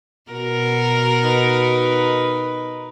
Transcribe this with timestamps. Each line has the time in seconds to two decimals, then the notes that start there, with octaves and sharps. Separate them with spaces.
0.31 B2 F#4 A#4
1.22 D#4 B4